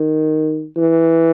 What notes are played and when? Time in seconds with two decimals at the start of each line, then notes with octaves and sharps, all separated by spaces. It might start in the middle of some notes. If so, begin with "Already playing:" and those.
Already playing: D#3
0.77 E3